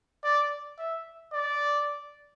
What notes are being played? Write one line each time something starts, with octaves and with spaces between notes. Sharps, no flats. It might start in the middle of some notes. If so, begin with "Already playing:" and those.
D5
E5
D5